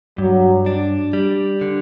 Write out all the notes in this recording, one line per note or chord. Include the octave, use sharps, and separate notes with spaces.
G2 F#3
D4
G3
D3